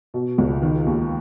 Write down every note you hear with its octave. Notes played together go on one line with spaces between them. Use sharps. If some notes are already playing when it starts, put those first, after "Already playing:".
B2
C#2
D#3
D#2